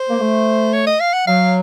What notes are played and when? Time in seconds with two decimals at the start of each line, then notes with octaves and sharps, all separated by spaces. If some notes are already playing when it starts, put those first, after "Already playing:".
Already playing: C5
0.09 A#3
0.20 A3
0.73 C#5
0.87 D#5
1.00 F5
1.14 F#5
1.27 F#3 F5